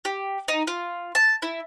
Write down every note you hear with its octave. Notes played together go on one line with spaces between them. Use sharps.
G4
D#4
F4
A5
E4